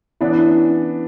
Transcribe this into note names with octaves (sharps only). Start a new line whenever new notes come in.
E3 B3 C#4 D4 E4